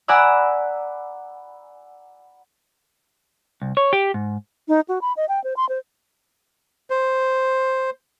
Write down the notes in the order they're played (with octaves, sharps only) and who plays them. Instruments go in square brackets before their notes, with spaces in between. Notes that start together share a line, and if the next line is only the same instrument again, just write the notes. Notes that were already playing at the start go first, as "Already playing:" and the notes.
[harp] D5 F#5 G#5 A#5 B5 E6
[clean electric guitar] C2
C#5
G4
G#2
[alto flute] D#4
F#4
B5
D#5
G5
C5
C6
C5
[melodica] C5